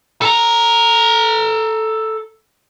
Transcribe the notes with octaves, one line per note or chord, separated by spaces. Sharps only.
A4 A#5